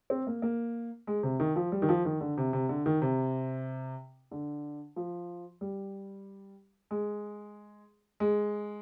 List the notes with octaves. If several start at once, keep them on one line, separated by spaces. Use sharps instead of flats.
C4
A#3
A#3
G#3
C3
D#3
F3
G3
D#3
F3
D#3
D3
C3
C3
D3
D#3
C3
D3
F3
G3
G#3
G#3